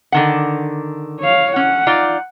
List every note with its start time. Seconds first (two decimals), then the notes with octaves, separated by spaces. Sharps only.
0.12 D3 D#3 F#5
1.20 C#5 F5
1.56 C#4 F#5
1.87 D#4 F4 D5